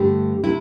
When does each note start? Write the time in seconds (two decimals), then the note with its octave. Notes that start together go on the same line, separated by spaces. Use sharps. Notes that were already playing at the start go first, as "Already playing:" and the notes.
Already playing: G2 D3 A3 G4
0.44 C3 E4